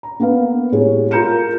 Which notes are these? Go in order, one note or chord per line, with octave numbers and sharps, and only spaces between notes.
A#5
A#3 B3 B4 F5
A2 G3 G#3 C#5
F4 A#4 A#5 G6 C#7 E7